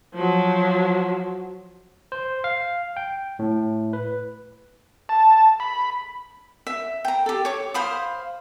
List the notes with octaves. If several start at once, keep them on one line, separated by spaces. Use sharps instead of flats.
F3 F#3
C5
F5
G5
A2
B4
A5
B5
E5
G5 A#5
G4 A4
C#5 D6
C5 F5 B5 D#6